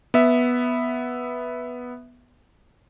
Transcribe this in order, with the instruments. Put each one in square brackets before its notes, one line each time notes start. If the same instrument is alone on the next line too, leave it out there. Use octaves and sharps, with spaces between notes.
[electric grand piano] B3 E5